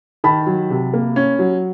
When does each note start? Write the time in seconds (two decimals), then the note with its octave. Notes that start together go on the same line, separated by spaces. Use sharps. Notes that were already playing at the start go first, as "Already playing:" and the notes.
0.24 D#3 A5 B5
0.46 F#3
0.70 C3
0.94 A#3
1.16 C#4
1.39 F#3